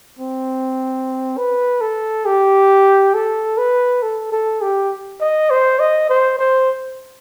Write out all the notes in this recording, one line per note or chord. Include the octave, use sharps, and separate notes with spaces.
C4
B4
A4
G4
A4
B4
A4
A4
G4
D#5
C5
D#5
C5
C5